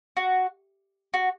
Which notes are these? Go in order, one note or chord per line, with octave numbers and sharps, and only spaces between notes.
F#4
F#4